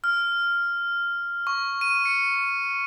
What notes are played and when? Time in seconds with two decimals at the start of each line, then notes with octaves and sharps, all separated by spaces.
0.04 F6
1.47 C#6
1.81 D#7
2.05 C#7